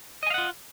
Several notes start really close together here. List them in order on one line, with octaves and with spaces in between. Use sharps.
D#5 G#5 F5 F#5 F4